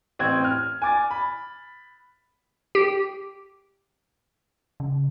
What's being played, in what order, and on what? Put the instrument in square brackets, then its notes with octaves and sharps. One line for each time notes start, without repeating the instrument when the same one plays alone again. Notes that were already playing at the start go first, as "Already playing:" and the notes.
[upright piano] A1 C4 G#6
F6
G#5 D6 A6
B5
[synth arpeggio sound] G4
[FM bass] C#3